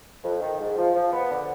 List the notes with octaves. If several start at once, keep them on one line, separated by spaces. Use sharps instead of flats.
F2
D#3
G#2
F3
F3
B3
D3